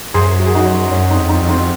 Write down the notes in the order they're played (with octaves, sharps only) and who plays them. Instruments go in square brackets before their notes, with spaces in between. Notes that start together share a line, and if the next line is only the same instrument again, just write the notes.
[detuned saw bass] F#2 [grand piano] G#4 C5
[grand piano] F#4
G#4
D#4 F#4
C#4
[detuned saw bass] F#2 [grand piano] C#4
[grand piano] C4 D#4
[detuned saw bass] F2
[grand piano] C4 D#4
[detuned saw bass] F2
[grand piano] C4 D#4